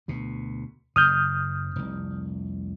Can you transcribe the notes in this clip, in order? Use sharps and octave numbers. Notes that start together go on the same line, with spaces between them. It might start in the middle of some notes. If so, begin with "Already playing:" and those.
D2 B2
F#1 C#3 D#6 F6 G6
F1 C2